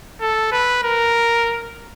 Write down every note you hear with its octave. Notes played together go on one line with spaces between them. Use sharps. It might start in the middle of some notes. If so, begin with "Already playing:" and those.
A4
B4
A#4